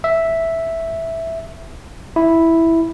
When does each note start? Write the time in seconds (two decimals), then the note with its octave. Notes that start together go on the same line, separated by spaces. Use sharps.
0.04 E5
2.16 E4